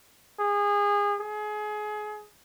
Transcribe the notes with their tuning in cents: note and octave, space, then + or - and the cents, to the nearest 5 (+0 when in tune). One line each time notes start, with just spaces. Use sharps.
G#4 -25
G#4 +25